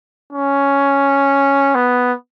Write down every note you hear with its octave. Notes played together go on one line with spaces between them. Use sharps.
C#4
B3